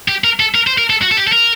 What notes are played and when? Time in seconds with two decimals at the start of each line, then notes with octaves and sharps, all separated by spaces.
0.08 G4
0.24 A#4
0.40 A4
0.55 A#4
0.67 C5
0.78 A#4
0.90 A4
1.02 F#4
1.12 A4
1.17 G4
1.27 A4
1.32 A#4